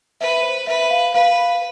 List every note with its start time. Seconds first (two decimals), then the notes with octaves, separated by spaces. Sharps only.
0.21 B4 E5
0.43 C5
0.67 B4 E5
0.90 F5
1.14 B4 F5